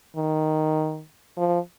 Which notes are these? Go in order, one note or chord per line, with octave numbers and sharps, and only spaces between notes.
D#3
F3